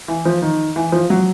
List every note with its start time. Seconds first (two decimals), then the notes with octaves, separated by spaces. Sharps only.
0.08 E3
0.25 F3
0.42 D#3
0.76 E3
0.92 F3
1.10 F#3